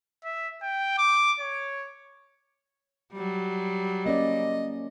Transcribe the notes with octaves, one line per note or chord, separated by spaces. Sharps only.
E5
G5
D6
C#5
F#3 G3
A#3 C#4 D5 D#5